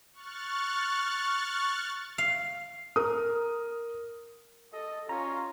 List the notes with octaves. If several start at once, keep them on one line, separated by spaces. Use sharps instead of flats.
C#6 F6 F#6 A6
F5
A#4 D#6
A4 D#5
C#4 F4 A#5